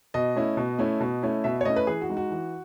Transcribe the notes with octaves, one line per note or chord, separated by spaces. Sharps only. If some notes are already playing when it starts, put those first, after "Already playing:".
B2 D#5
A3 C#4 E4
B2
A3 C#4 E4
B2
A3 C#4 E4
B2 E5
C#5
A3 C#4 E4 D#5
B4
E3 G#4
F#4
G#3 D#4
F#4
E3